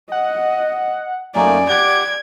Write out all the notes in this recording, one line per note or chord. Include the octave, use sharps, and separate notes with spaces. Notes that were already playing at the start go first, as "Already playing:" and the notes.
D#5 F#5
F#2 A3 A#3 D#4 D5 G#5
G4 F#5 G#6 D7